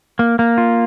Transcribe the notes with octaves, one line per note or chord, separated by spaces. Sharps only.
A#3
A#3
F4